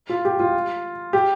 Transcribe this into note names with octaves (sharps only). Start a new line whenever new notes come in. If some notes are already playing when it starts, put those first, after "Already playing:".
F4
G4
F4
G4